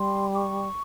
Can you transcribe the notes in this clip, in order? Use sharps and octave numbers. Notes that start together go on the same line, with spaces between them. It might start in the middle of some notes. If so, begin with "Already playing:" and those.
Already playing: G3 C6
D6
C#6